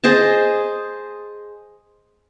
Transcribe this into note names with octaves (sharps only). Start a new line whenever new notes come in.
G#4 C5 D#5 A5